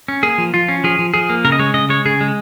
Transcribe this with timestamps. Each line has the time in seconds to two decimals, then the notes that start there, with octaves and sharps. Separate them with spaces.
0.08 C#4
0.23 A#3 G#4
0.38 F3
0.54 F3 F4
0.69 C#4
0.84 F3 G#4
0.99 F3
1.14 F3 G#4
1.30 A#3
1.45 C#3 A#4
1.52 D#5
1.59 G#3 C#5
1.74 C#3 D#5
1.89 G#3 C#5
2.05 C#3 G#4
2.21 G#3